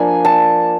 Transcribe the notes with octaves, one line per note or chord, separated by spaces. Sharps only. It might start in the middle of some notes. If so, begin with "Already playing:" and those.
Already playing: F3 A#3 D4 G#5
A5